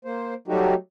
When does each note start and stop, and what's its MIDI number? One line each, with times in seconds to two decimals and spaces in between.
0.05 0.34 58
0.05 0.34 72
0.48 0.74 54
0.48 0.74 55
0.48 0.74 57
0.48 0.74 63
0.48 0.74 66
0.48 0.74 67